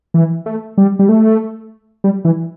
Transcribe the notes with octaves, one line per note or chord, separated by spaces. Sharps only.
E3
A3
G3
G3
A3
G3
E3